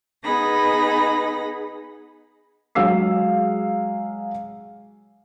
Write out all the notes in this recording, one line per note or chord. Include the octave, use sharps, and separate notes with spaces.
B3 D#4 G#4 B5 A#6
F#3 G#3 G#4 F5 E6 C7